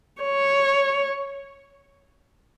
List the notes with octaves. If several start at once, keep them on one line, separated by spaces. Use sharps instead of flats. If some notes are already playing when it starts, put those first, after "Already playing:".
C#5